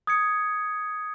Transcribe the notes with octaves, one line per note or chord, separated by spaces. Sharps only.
D#6 G#6 C#7